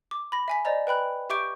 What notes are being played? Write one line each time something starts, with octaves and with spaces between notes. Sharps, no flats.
D6
B5 A#6
E5 G#5 B6
C5 D5 D#5 A#5
B4 G5 B5 F#6
G4 E5 C#6 D6 G6 D7